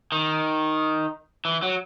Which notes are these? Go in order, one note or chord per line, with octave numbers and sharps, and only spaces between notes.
D#3
E3
F#3